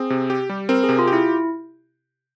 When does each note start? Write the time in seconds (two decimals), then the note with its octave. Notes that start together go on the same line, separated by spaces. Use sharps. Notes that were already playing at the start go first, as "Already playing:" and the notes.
Already playing: C4 G#4
0.10 C3
0.30 G4
0.49 G3
0.69 C4 A#4
0.84 C3 G#4
0.99 F4
1.07 G4
1.13 E4